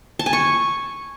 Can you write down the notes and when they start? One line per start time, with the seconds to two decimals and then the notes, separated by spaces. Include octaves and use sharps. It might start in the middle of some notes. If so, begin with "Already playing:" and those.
0.19 A5
0.26 G#5
0.33 C#6